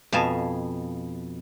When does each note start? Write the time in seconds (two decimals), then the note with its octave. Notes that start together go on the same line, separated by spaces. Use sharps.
0.12 F2 B2 F5 G#5 A5